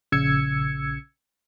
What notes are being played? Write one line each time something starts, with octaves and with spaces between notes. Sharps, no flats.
A#1 C#3 E6 G#6 C#7